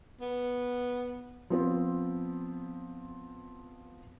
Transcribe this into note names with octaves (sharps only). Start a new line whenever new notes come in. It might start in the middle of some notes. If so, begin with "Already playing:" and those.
B3
F3 B3 C4